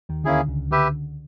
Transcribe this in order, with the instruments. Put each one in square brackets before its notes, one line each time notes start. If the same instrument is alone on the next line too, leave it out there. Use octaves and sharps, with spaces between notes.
[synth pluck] D#2 D#3
[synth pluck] D2 D3 [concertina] A#3 C#4 E4 G#4
[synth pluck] C#2 C#3
[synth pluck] D2 D3 [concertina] G4 B4 E5